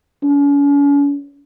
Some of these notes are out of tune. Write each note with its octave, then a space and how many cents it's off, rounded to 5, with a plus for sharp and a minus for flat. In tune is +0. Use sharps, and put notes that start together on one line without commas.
C#4 +40